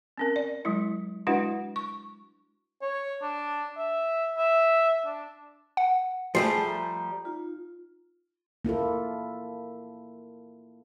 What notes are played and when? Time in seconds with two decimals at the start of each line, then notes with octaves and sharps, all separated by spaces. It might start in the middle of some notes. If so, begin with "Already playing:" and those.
0.18 C4 C#4 A#4
0.36 D5
0.65 F#3 G#3 E4
1.27 G#3 D4 E4 F#4 B4 F#5
1.76 C#6
2.82 C#5
3.22 D4
3.77 E5
4.37 E5
5.06 D4
5.77 F#5
6.35 F3 G3 A3 G#4 G#5 A5 C7
6.68 A#5
7.25 D#4 F4
8.65 A#3 E4 F4 A4